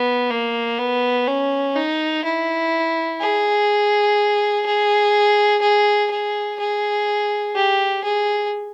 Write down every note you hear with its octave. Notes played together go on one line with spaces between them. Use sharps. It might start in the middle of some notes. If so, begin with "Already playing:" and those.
Already playing: B3
A#3
B3
C#4
D#4
E4
G#4
G#4
G#4
G#4
G#4
G4
G#4